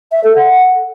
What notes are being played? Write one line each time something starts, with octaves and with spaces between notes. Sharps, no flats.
E5
A4
F#5